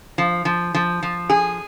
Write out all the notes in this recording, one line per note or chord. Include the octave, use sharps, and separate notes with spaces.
F3
F3
F3
F3
G#4